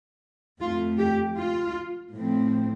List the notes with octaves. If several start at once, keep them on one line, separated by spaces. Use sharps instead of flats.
F2 F3 A3 F4
G4
F4
A2 F3 C4